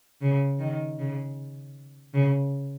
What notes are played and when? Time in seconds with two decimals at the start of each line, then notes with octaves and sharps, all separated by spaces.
0.22 C#3
0.59 D#3
0.99 C#3
2.14 C#3